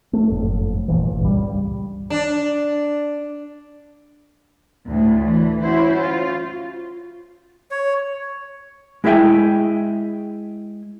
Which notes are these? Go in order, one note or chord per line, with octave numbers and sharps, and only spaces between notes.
A3
F#1 F2 A2
G1 C2 A#2 E3
C#2 G2 G3
D4
D2 A2
E3
C#4 E4 F#4 C5
F4
C#5
G#3 E4 G#4 E5 G5 G#5